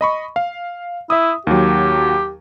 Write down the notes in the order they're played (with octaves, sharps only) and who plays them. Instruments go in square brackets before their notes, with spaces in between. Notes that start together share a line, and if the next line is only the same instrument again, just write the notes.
[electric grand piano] D#5 B5 C#6
F5
[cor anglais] E4 [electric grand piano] E5 D#6
[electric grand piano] D#2 F#3 [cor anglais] G4